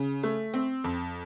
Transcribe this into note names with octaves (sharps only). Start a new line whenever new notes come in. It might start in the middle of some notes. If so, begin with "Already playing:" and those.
Already playing: C#3
A3
C4
F2